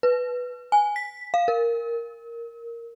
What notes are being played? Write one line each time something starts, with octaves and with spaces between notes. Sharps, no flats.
B4
G#5
B6
F5
A#4